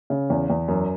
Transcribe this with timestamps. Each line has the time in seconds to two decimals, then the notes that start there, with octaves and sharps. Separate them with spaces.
0.10 C#3
0.30 E2
0.50 E2
0.68 F#2